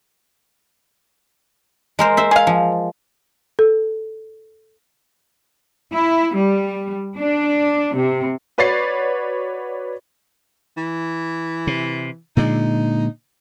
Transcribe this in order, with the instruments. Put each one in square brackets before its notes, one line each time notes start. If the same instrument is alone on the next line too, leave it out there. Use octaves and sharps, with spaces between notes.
[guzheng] G#3 A#4 C5
C5 E5
[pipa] G#4 F5
[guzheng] F3
[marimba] A4
[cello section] E4
G3
D4
C3
[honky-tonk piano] F#4 B4 C#5 D5 A6 C7
[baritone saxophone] E3
[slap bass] C3
[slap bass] A#2 D3 G#3 [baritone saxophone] D#4